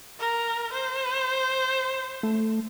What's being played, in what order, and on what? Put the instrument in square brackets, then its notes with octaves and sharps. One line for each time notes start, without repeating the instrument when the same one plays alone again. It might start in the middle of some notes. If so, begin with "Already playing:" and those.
[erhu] A#4
C5
[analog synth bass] A3